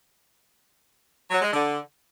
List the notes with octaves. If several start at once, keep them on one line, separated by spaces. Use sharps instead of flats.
F#3
G#3
D3